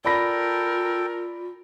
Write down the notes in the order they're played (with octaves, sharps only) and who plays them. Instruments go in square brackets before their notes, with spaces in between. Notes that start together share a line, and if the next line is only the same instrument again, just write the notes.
[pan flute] F4 [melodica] A4 G5 [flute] A#4 [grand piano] D5 B5 A#6